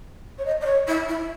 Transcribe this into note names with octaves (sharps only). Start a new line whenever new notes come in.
C#5
D#5
D#5
C#5
E4
E4